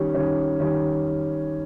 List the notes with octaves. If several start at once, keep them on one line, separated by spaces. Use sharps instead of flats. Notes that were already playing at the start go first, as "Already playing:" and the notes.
Already playing: D#3 G3 C#4
D#3 G3 C#4
D#3 G3 C#4